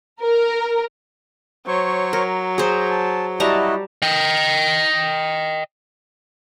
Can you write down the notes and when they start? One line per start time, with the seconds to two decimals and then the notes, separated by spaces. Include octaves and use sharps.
0.21 A#4
1.67 F#3 C5 C#5 C#6
2.13 A#4
2.58 G#4 C5 A#5
2.91 A5
3.40 G3 E4 F#4 D#5 A5 A#5
4.03 D#5 G5